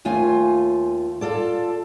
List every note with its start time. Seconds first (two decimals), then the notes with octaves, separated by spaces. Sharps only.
0.05 D#2 A3 F4 G#5
1.21 F4 A4 D5